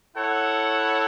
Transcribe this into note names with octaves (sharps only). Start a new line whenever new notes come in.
E4 A4 C#5 F#5